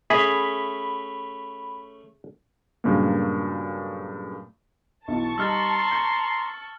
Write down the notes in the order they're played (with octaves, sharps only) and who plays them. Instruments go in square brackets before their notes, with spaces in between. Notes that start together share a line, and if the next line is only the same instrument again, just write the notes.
[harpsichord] A3 C#4 [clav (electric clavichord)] G#4 [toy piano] E5 [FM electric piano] B5
[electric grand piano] G2 A#2 C#3 F#3 A3 A#3
[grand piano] B1 E3 F4 [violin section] A5 C#6
[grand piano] G3 D#4 [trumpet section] A#5 C6 [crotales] E6 F6 A6
[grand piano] G6